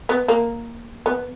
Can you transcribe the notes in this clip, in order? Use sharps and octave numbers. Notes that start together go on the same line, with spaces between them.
B3
A#3
B3